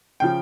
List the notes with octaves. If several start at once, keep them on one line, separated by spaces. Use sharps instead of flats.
C#3 F3 G5